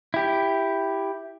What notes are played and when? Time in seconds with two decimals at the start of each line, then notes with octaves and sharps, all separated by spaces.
0.14 E4 G4